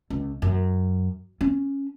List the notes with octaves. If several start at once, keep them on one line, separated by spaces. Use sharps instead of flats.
C#2
F#2
C#4